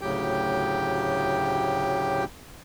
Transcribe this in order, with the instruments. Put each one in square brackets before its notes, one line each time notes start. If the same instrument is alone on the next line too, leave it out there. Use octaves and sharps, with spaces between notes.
[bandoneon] D2 A2 C#3 F#3 G4 G5